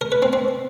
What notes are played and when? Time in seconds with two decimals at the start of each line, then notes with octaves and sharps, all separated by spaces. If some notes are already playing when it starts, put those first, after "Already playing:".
0.01 A#4
0.12 B4
0.22 C4
0.33 C4